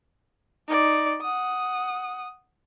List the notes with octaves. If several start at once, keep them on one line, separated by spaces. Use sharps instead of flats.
D#4 D5
F#5 D#6